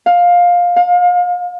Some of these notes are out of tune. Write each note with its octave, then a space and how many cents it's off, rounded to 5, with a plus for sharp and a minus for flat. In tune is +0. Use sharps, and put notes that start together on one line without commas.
F5 +15
F5 +35